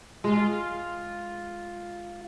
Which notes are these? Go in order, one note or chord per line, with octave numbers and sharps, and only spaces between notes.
G#3 F4